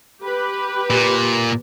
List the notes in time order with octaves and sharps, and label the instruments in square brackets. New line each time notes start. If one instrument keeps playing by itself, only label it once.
[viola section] G4 B4
[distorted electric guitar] A#2